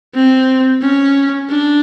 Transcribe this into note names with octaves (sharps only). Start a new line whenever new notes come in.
C4
C#4
D4